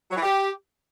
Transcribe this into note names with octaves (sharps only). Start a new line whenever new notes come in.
F#3
E3
G4